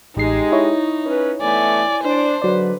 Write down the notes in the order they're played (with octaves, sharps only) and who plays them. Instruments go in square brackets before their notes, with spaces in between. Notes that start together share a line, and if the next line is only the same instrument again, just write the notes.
[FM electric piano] A1 C7 [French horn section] G#3 G4 [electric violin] D#4
[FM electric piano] E4 C#5
[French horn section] C#4 B4
[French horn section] E3 A3 B3 [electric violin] D5 G#5
[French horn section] D4 [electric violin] C5
[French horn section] G#2 D3 B4 [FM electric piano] F#3 D5